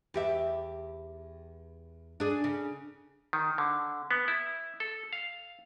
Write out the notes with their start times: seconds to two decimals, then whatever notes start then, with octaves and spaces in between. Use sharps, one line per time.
0.14 E2 G4 E5
2.20 D4 G#4
2.44 C#3
3.33 D#3
3.58 D3
4.11 B3
4.28 E4
4.80 A4
5.13 F5